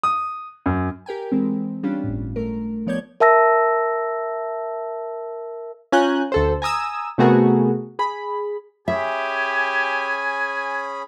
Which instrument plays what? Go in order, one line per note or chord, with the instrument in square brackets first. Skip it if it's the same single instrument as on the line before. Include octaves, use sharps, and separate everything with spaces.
[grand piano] D#6
F#2
[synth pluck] G4 A#4 G5 G#5
E3 G#3 C4
G3 C#4 D4 F4 G4
G1 A2
A3 A#4
F3 B3 C#5 D5 G6 G#6
[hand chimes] A#4 E5 A5 E6 A#6
[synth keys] C#4 F4 G#5 A#5 F#6 G6
D2 A4 C5
G#5 A#5 D#6 E6
C3 A3 B3 F#4 G#4 A#4
G#4 B5
[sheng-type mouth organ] C#4 G#4 B5 [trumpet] G4 [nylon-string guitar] E5 [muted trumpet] G#5